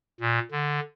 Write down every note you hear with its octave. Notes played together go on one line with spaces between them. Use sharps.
A#2
D3